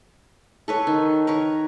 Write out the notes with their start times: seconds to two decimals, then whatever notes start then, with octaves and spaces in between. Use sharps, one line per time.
0.68 A4 B4 C#5
0.87 D#3
1.27 A#4 B4 C#5